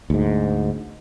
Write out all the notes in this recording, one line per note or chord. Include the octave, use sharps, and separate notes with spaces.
D2 G#2